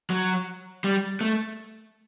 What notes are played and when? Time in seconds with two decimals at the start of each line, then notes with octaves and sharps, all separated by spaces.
0.10 F#3
0.84 G3
1.21 A3